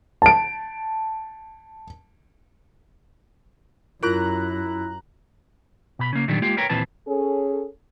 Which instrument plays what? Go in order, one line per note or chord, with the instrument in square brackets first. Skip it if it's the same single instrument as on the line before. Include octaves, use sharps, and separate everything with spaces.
[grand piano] A5 D7
[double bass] F#2 [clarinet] E4 [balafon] F4 A#4 [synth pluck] A#5 F#6
[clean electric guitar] B2 B5
C#3 A#3
A#2 D3 D#3 F#3 G3 D4
G#3 A#3 F4 G4
A#4 B4 C#5 G5 A#5
D#2 A#2 E3 C4 B4 A5
[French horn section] C#4 G#4 A4